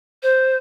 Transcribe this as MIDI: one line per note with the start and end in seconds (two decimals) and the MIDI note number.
0.23 0.56 72